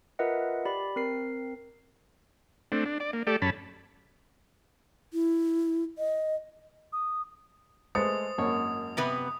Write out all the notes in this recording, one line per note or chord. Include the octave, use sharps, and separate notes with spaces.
F4 A#4 B4 D#5 E5 F#5
G4 D5 B5
C4 A#4 C7
A3 C4 D4
D4
D5
A#3
A3 G4 A4 D5
F#2 C#4 A5 B5
E4
D#5
D#6
G#3 A3 B4 C5 D#6 A6 C#7
G#1 F#2 A#3 C#5
C3 B3 B4